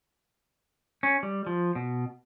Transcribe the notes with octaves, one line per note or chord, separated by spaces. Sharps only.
C#4
G3
F3
B2